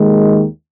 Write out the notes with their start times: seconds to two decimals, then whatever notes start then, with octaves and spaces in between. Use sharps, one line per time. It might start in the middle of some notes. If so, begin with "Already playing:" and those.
Already playing: D#2 D#3 G#3